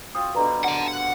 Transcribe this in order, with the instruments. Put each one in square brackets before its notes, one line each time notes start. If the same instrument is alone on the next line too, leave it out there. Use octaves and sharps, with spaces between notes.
[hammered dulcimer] C4 F4 F#4 [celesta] D#6
[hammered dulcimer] B2 D3 G3 [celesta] B4 A#5
[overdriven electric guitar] F#5 A5
F#5